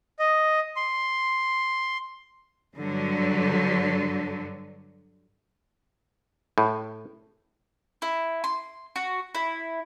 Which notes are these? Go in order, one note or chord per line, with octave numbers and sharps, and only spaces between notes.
D#5
C6
G2 D3 F#3
A2
E4
C6
F#4
E4